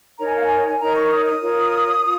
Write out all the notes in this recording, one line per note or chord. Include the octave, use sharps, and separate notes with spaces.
D#4 A#4 C#5 A#5
G#5
F5
G#5
G#5
D#4 A#4 C#5 A#5
C#6
C#6
D#6
D#6
F4 A#4 C#5
F4